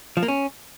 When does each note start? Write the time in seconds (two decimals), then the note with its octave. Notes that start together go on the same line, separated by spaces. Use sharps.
0.17 F3
0.23 A#3
0.28 C#4